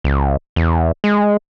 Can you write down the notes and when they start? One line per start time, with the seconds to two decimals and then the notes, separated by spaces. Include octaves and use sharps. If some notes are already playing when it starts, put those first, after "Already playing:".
0.04 C#2
0.56 E2
1.04 G#3